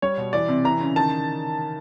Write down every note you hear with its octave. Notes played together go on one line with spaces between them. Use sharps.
G3 C#5
B2
E3 D5
C3
E3 A#5
C#3
D#3 A5